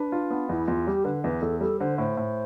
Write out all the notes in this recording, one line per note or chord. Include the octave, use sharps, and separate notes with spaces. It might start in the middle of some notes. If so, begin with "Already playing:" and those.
Already playing: D4 B4
F4
B3
E2 E4
E2 F4
G3 G4
D3 B4
E2 B4
E2 A4
G3 A4
D3 C5
A2 C5
A2